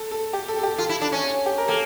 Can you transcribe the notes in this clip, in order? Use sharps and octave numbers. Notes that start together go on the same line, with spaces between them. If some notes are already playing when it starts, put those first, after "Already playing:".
Already playing: A4
A4
G4
A4
A4
G4
F4 A4
E4
D4 A4
C#4
G4
A#4
A#3 A4